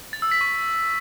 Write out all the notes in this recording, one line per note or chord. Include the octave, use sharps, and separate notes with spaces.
A6
E6
B6
C#6